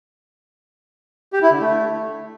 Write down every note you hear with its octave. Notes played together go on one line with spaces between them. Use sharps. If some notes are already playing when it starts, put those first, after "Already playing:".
G4
E4
D3
A3